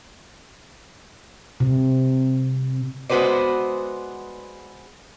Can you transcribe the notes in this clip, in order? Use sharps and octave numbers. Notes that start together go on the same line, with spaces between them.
C3
G#3 B3 F#4 B4 C5 D5